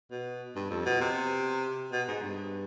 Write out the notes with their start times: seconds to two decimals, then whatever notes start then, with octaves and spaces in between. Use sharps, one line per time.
0.11 B2
0.55 G2
0.71 F2
0.86 B2
1.01 C3
1.92 B2
2.08 G#2
2.22 G2